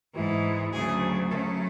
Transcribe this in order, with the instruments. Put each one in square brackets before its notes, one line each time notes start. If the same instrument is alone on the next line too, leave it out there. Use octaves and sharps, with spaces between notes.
[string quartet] G#2 E3 G#3
D2 C#3 F#3 A3 G#4
C#3 F#3 A3 C#4 A4